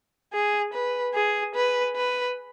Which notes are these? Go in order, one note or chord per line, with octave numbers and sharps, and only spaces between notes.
G#4
B4
G#4
B4
B4